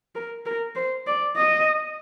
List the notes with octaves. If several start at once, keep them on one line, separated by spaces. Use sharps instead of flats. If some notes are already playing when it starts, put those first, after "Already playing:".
A#4
A#4
C5
D5
D#5